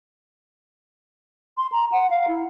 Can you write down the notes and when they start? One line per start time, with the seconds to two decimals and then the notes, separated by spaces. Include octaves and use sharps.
1.57 C6
1.72 A#5
1.92 F#5
2.10 F5
2.28 E4